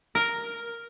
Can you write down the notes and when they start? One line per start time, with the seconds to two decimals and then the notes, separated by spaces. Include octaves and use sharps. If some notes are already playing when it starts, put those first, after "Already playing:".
0.15 A#4